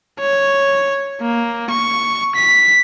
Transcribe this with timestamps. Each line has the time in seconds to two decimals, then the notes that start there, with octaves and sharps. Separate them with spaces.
0.20 C#5
1.22 A#3
1.71 C#6
2.35 B6